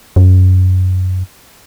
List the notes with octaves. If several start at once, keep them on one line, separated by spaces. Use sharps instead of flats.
F#2